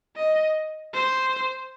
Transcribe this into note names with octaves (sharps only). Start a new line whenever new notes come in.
D#5
C5